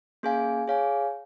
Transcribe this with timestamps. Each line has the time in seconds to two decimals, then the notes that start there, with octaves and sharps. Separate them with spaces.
0.23 A#3 C#4 G#4 F5 G#5
0.67 G#4 C#5 F5 G#5